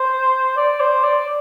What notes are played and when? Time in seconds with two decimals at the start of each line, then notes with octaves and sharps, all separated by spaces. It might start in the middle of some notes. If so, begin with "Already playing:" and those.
Already playing: C5
0.57 D5
0.80 C5
1.04 D5